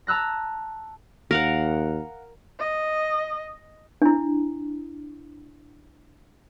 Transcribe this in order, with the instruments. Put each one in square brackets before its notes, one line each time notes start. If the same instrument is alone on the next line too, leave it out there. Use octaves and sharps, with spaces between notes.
[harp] A5 A#5 E6 F#6 A#6
[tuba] D#2 [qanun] A#4 F5 F#5
[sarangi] D#5
[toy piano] D4 E4